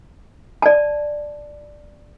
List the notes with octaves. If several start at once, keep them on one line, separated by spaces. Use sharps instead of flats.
D5 A5